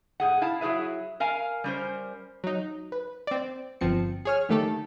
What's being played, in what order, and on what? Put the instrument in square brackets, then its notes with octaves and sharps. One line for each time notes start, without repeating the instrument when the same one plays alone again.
[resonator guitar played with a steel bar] G#2 G#4 F#5
E4 F5 A5
F#3 E4 G#4 B4 E5
A#4 F5 G#5 A#5
G3 C#4 A#4 C5
[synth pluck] F#3 D#4
B4
C4 D5
G1 F3 C4 C#7
G#4 C#5 F6
D3 D#3 A3 G4 A4